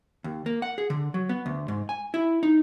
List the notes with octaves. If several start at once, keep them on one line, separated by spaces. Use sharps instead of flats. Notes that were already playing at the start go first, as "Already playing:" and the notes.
D#2
A#3
F#5
G#4
D3
F#3
B3
D2
G#2
G#5
E4
D#4